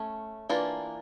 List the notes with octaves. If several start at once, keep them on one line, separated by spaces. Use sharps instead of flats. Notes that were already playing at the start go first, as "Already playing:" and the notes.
Already playing: A3 C#4
E3 A#3 D4 F4